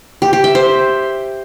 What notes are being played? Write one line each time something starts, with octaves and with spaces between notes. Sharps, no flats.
G4
G4
E5
C5